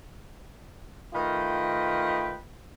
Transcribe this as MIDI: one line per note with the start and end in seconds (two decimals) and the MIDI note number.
1.14 2.40 51
1.14 2.40 57
1.14 2.40 65
1.14 2.40 71
1.14 2.40 75
1.14 2.40 79